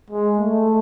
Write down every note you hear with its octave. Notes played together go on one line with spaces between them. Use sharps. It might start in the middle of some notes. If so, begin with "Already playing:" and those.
G#3
A3